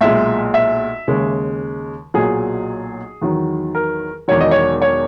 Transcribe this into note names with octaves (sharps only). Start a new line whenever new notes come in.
B1 A#2 G#3 E5
E5
D#2 C#3 G#3
B1 A#2 F#3 G#4
E2 D#3 F#3
A#4
E1 E2 D#3 F#3 C#5
D#5
C#5
C#5